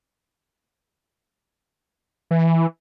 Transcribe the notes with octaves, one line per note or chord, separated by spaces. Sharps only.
E3